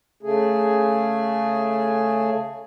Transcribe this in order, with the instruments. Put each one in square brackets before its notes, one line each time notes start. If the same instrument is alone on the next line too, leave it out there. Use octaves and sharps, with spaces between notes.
[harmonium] C#3 A3 G#4